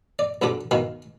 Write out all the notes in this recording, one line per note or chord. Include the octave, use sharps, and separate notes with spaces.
D5
B1 G2 D3 F3 B5 D6
D#3 B3 F#4 F5